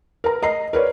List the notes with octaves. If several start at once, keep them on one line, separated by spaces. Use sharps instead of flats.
A#4 B4 A#5
D#5 A#5 C7
A#4 B4 C#5 D5